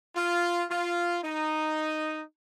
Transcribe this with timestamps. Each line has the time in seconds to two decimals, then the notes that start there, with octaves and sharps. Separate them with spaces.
0.15 F4
0.70 F4
1.24 D#4